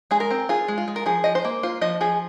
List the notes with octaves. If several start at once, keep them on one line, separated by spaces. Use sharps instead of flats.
G#3 G#4
A#4
C4
F4 G#4
G#3
F4
G#3
A#4
F3 G#4
F3 D#5
C5
A#3
F4 C5
F3 D#5
F3 G#4